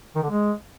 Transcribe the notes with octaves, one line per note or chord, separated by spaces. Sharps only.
D#3
D3
G#3